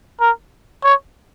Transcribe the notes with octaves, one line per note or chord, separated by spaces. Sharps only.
A#4
C#5